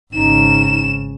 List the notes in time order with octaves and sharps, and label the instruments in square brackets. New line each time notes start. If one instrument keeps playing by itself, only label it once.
[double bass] G#1 C#3 [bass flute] D#4 [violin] E7